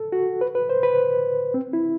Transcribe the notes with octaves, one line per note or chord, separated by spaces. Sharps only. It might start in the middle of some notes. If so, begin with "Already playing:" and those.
Already playing: A4
F#4
B4
B4
C5
B4
C4
E4